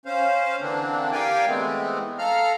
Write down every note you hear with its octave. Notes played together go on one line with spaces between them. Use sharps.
C#4 C5 F5
D3 E3 A#3 C4 D4
G4 A#4 D5 F5 G5 G#5
E3 G#3 A3 B3 C4
A4 F5 A#5 F6